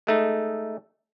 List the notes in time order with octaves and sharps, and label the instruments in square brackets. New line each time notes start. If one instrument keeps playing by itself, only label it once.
[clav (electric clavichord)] G#3 A3 D#4